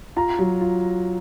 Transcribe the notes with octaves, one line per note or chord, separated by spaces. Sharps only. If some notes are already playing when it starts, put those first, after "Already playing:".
F4 A#5
F#3
F4